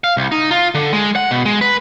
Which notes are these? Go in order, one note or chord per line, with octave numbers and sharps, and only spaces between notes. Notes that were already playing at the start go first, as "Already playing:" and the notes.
F5
C2
D#4
F4
D3
G#3
F#5
B2
G#3
B4